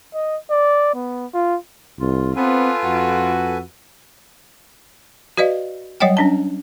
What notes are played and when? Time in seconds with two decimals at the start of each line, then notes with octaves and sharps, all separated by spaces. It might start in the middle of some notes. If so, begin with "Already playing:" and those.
0.14 D#5
0.51 D5
0.95 B3
1.34 F4
2.00 C2 F4
2.36 B3 C4 F4 A4 B4 G#5
2.84 F2 F#4
5.37 F#4 B4 D5 D#5 F5
6.00 F#3 G3 C#5 D#5 F#5 G5
6.17 C#4 D4 A5